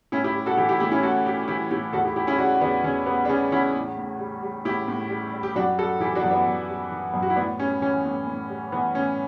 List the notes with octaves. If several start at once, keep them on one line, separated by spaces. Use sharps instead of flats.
A2 C#4 E4
E4 G4
G3
F#4 A4
E3 E4 G4
E4 G4
A2 E4 G4
C#4 E4
A2 F#4 A4
G3 E4 G4
E3 E4 G4
A2 E4 G4
E2 F#4 A4
E4 G4
G3 E4 G4
C#4 E4
C#3 D4 F#4
E2 B3 D4
E2 C#4
G3 B3
D4
C#3 C#4
E2 C#4 E4
A2
A2
G3
G3
A2 E4 G4
A2
G3
G3
G4
F#2 D4 F#4
G3 F#4 A4
E3 E4 G4
D4 F#4
F#2
B3 D4
F#2
G3
E3
F#2
F#4
E4
A2 B3 D4
G3 C#4
E3 C#4
A2
A2
G3
E3 B3
A2 C#4